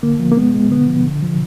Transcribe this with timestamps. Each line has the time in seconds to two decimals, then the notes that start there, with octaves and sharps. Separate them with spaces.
0.03 D3 A#3
0.20 F3
0.32 A#3
0.37 G#3 B3
0.54 G#3
0.71 D3 B3
0.88 F3
1.06 D3
1.22 F3